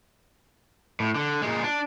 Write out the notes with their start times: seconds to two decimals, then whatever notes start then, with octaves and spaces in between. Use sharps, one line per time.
1.00 A2
1.15 D3
1.42 A#2 G#3
1.63 D4